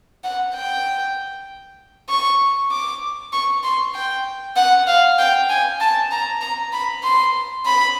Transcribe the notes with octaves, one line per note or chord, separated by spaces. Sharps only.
F#5
G5
C#6
D6
C#6
C6
G5
F#5
F5
G5
G#5
A5
A#5
A#5
B5
C6
B5